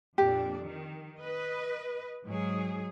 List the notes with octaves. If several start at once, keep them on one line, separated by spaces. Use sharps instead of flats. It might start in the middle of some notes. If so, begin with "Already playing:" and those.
F2 A#2 D4 G4
D#3
B4 D#5
G#2 F#3 G#4